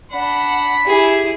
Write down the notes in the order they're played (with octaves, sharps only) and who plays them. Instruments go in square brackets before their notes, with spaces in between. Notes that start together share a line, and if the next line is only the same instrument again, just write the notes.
[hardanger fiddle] D4 F#5 [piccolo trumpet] B5
[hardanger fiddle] E4 G#4 [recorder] G4